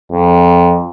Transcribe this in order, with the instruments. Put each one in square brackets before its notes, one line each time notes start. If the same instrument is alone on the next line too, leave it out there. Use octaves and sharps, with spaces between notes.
[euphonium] F2